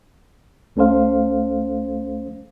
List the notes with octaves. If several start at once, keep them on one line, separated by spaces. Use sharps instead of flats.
C#2 A3 C#4 A4 C5 F5